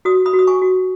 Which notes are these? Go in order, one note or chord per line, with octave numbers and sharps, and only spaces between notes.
F#4 D#6
B5 D#6
F#4
D#6
G#5 C#6
F#4